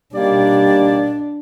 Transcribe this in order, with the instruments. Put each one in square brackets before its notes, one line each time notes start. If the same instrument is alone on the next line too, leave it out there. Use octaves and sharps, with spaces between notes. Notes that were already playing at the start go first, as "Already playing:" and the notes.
[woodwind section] D#3 A#3 D5 [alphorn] G3 [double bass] D4